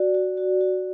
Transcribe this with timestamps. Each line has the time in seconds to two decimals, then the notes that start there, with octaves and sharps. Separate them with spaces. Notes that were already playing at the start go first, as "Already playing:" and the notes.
Already playing: F#4 D5
0.15 F#4
0.37 F#4
0.61 F#4